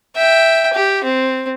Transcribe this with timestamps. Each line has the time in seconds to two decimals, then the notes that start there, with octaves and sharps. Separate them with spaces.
0.16 E5 G5
0.74 G4
1.04 C4